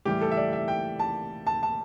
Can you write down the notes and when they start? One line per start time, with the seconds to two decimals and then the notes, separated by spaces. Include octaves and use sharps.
0.05 A2 E3 G3 G4
0.21 A4
0.31 E5
0.37 D5
0.53 E5
0.68 G5
0.99 A5
1.47 A5
1.63 A5